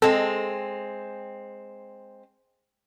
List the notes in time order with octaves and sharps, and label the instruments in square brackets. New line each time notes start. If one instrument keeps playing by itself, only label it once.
[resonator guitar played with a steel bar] G#3 C4 [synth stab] A4